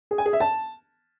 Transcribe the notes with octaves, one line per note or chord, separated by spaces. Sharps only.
G#4
G#5
G#4
E5
A5